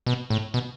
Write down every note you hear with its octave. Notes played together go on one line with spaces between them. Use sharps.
B2
A2
B2